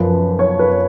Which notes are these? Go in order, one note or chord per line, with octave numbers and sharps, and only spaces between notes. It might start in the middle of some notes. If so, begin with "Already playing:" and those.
Already playing: F#2 F3 B4
C#5
B4